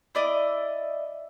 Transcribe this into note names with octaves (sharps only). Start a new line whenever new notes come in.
E4 D5 D#5